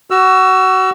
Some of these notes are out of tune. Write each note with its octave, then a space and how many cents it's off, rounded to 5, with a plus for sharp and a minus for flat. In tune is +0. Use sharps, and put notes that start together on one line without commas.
F#4 +20 E6 +20